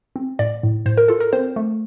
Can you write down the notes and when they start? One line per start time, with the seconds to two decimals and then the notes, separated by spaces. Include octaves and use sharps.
0.16 C4
0.39 A2 D5
0.63 A2
0.86 A2 C5
0.97 A#4
1.08 F4 A4
1.20 A#4
1.33 C4 C5
1.56 A3